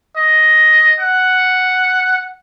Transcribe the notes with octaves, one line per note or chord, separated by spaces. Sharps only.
D#5
F#5